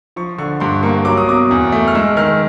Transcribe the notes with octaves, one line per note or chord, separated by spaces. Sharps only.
F3 C#6
D3 C#6
G2 C6
A#3 C#6
F#3 D6
D#6
B2 D6
E2
A3
F6
G#3 E6
D#3 F6